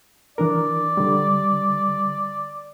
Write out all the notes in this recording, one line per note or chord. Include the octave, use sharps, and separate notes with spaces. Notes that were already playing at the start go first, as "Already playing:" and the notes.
E3 D4 A#4 D5
D3 G3